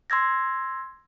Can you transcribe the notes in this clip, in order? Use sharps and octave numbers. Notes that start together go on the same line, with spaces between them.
C6 E6 G#6 A#6